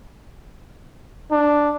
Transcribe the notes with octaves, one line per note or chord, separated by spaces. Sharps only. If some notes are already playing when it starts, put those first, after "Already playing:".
D4